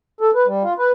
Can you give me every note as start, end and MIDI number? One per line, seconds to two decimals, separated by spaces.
0.21 0.31 69
0.35 0.46 71
0.47 0.63 55
0.63 0.74 65
0.79 0.92 71